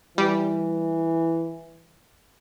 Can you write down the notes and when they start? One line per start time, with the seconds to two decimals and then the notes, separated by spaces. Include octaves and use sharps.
0.18 E3 G3